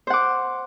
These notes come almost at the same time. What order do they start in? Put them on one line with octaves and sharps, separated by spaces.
C5 F#5 D6